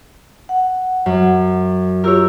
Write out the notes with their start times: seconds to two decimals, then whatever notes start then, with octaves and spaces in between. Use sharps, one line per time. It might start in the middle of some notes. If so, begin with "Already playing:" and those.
0.49 F#5
1.06 F#2
2.04 F4 G4 A#4 C#5 E6